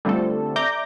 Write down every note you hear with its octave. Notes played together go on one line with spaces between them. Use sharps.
D3 G3 A3 C4 F4 A4
D5 E5 A#5 D6 G6 A#6